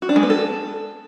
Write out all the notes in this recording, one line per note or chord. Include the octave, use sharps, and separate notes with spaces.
F#4
D4
G#3
B3
A4